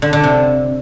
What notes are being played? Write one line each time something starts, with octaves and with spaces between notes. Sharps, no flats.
D3
D3
C3